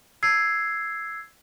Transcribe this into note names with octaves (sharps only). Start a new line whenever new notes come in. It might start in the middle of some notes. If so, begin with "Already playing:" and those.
E6 G#6 C7